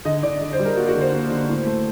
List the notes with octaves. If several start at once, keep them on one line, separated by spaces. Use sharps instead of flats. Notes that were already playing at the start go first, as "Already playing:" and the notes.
D3 D#5
D3 D5
D3
C5
G3
A#4
A#3 F#4
F#4
D3
C5
A#3
D3
A2
A3